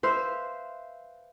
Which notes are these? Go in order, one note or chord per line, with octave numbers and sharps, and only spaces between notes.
B4 C5 E5 F5